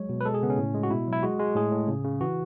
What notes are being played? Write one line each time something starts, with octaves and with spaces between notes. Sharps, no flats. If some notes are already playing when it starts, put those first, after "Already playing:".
Already playing: F#3 G#3 C#5
B2
B4
G#3 A4
G#4
C#3 B3
C#4
A2
G#3
F#4
B2 E4
F#3 E4
G#3 F#4
G#3
A2 G#4
A2
C#3
C#3
E3 F#4